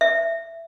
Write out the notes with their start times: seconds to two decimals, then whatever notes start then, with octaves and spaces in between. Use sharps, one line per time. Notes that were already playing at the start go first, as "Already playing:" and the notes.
0.01 E5